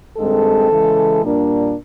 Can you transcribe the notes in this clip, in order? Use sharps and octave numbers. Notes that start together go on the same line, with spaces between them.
G2 D#3 G#3 C4 A4
C#3 E3 G#3
A#2 G3 A#3 D4